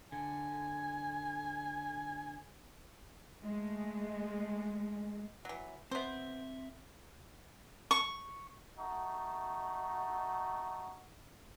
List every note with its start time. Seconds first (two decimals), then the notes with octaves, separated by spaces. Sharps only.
0.12 D3 G#5
3.43 G#3 A3
5.45 E3 F#3
5.91 B3 C4 C5 E5
7.91 C#6
8.78 A3 D#4 F#4